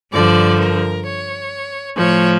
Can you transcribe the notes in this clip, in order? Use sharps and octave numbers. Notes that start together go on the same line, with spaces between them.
G2 D3 F3 D5
A#4
C#5
A2 F3 C#5